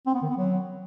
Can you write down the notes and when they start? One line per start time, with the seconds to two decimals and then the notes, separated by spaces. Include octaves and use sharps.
0.06 C4
0.14 B3
0.22 D#3
0.30 B3
0.37 F#3